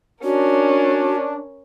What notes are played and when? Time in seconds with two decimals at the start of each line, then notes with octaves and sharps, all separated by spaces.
0.24 C#4 D4 F#4 A#4